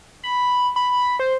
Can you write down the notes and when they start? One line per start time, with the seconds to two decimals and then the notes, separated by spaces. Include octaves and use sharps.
0.24 B5
0.76 B5
1.19 C5